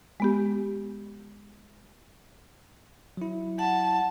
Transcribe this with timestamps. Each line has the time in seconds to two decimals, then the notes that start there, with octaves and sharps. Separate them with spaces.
0.20 G#3 B3 G4
3.17 F#3 E4
3.59 F#5 A5